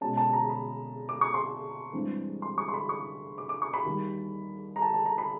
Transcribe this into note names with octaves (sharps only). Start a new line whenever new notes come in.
B2 G#3 C#4 A5
A5
A#5
B5
D6
C#6
C6
G2 E3 G#3 C4
C6
C#6
C6
B5
C#6
D6
D6
C#6
B5
D#2 D#3 G3
A#5
A5
A5
A#5
B5